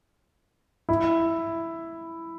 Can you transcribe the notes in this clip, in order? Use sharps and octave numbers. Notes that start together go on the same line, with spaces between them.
E4